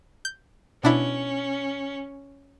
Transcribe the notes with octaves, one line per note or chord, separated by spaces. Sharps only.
G6
B2 C#4 D4 E4